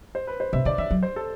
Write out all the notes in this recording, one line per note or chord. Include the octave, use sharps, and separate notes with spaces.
C5
B4
C5
C3 E5
D3 D5
E3 E5
F#3
C5
A4